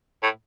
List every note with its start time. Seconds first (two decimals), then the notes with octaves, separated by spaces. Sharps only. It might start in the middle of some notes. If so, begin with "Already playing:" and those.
0.23 A2